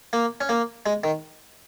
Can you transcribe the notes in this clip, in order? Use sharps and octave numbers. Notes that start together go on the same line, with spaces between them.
A#3
C#4
A#3
G#3
D#3